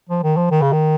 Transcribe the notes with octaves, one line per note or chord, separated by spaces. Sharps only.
F3
D#3
F3
D#3
C#3
D#3